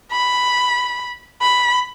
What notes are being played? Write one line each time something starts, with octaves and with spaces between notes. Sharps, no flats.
B5
B5